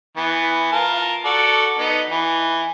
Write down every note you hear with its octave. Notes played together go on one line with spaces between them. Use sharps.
E3 B3
F4 A#4 A5
F#4 A4 D5
B3 D#4
E3